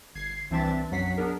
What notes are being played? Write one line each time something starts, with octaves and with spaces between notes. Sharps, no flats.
G1 G#6 C7
C2 E3 C4 D4 E5 A6
B1 F#2 F#3 F#5 B6 C7
B3 D4 G#4 A#4